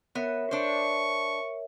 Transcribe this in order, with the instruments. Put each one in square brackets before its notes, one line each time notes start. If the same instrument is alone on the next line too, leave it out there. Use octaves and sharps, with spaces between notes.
[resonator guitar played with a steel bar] B3 [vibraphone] A#4 C#5 E5
[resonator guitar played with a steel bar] D4 C5 [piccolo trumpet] C#6